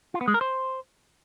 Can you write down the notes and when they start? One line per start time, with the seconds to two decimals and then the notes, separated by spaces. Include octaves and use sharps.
0.14 F4
0.21 B3
0.28 G#3
0.34 A#4
0.41 C5